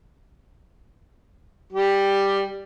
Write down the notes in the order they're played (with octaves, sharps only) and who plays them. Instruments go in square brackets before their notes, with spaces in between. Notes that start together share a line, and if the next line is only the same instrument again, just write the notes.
[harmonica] G3 G4